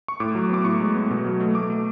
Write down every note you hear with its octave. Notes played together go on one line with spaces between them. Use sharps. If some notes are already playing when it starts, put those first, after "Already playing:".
C#6
A2 D6
F#3
B3 D6
A2 C#6
G#3
B3
B2
F#3
A3
A3 D6
A3